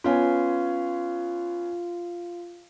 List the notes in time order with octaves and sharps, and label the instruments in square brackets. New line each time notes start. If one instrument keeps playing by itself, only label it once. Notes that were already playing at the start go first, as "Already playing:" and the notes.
[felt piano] B3 C#4 G#5 [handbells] F4 F5